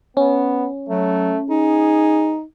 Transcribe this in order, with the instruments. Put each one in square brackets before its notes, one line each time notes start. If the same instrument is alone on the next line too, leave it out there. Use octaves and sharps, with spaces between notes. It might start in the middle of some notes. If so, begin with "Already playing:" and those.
[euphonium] B3 [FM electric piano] C#4
[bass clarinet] F#3 [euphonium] A3
[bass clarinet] D#4 [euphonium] G#4